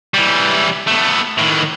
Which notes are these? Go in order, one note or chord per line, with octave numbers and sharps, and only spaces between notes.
E3 G3
A3 B3
A2 D#3